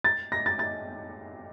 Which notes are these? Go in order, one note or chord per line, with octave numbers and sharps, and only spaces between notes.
A6
A#6
A6
A6